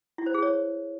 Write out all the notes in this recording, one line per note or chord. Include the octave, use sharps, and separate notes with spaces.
E4
C5
G#4
C#5